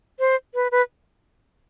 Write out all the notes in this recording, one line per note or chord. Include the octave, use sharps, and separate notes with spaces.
C5
B4
B4